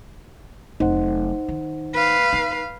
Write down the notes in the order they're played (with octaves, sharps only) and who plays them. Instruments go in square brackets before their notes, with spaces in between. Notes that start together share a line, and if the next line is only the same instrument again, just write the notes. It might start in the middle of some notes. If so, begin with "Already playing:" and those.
[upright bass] F1 F#3 [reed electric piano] D#4 C5 F#5
[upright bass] D#3
[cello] B4 F5
[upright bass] D#4